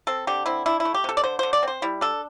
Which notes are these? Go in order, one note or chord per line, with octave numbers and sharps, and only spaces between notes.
C4 A4
D3 G4
C4 E4
D4 E4
E4
A3
G4
C3 A4
D5
D3 C5
D3 C5
D5
C4 C5
G3 E4
D4 A4